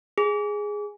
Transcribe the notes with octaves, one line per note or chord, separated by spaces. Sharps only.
G#4